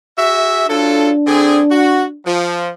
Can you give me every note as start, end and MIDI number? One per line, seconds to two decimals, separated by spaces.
0.17 0.67 66
0.17 0.67 68
0.17 0.67 76
0.68 1.11 54
0.68 2.18 62
0.68 1.11 65
0.68 1.11 69
1.26 1.60 50
1.26 1.60 60
1.26 1.60 68
1.70 2.04 66
2.25 2.70 53